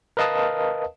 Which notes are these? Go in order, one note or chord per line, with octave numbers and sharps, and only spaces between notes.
A#4 B4 D#5 F5 A5 D#6